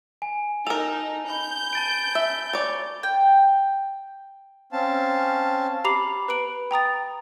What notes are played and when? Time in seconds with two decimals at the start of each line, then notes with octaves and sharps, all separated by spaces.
0.22 G#5
0.67 D#4 A4 A#4 F7
1.30 B5 G6
1.73 A5 A6 D7
2.15 E5
2.53 C#5 D5 A6
3.03 G5
4.73 C4 C#4 F5 A5
5.84 G4 A#5 B5 D6 C7 F7
6.28 B4 B5 D7 F#7
6.71 G5 A#5 D#6 A6